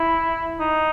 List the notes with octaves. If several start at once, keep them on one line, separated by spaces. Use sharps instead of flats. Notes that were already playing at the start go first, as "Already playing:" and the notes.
Already playing: E4
D#4